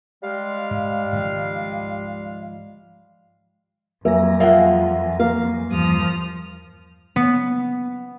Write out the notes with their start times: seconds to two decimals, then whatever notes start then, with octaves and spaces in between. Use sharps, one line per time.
0.23 G3 G#3 F5
0.71 G#2
1.13 G#2 D#3 F3
4.05 F2 F#3 A#3 E5 G#5 A#6
4.40 F3 G#3 A#3 E5 F#5
5.20 A#3 F5
5.71 E2 G2 F3 G3 D#6 F6
7.16 B3